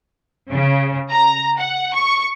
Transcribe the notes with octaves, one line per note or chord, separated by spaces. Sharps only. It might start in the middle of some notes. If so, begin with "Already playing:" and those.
C#3
A#5
F#5
C#6